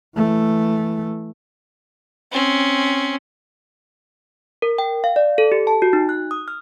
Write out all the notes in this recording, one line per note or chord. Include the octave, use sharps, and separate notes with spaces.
E3 A3
C4 C#4
A#4
G5
F5
D5
A4
G4
A5
F#4
D#4
F#6
D#6
F6